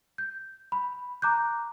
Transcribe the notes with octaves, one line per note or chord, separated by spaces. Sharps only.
G6
B5
A#5 D6 F#6 G6